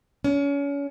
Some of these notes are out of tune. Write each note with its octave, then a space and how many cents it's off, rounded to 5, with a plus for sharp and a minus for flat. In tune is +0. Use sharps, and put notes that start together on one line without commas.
C#4 +35